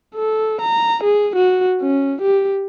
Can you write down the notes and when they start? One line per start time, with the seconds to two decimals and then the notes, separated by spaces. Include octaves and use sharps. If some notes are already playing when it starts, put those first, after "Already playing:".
0.15 A4
0.61 A#5
1.04 G#4
1.36 F#4
1.82 C#4
2.22 G4